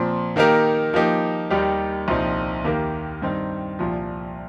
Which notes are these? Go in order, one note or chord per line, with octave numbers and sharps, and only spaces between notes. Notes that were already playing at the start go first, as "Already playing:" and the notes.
Already playing: A#2 F3 C4
D#3 A#3 D#4 G4 A#4
F3 A#3 D#4 G4
D#2 D#3 G3 D#4 G4
C2 A#2 F3 C4 D#4
D#2 D#3 A#3 G4 A#4
G2 D#3 C4 D#4
C2 A#2 F3